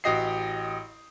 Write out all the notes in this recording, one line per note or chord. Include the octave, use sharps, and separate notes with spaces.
A1 F#4 G4 D#5 D#6 C7